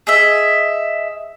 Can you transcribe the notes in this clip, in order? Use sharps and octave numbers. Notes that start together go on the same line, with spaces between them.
G#4 D#5 E5